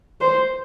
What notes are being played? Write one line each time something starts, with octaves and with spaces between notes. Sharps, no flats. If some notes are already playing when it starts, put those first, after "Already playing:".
C5